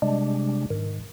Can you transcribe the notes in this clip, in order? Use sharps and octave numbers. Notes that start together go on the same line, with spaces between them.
C3 G3 G#3 D4
G#2 D#3